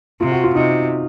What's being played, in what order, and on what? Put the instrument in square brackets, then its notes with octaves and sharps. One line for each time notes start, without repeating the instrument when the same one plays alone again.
[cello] C3 [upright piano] F4
[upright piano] F#4
F4
[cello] C3 [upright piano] D#4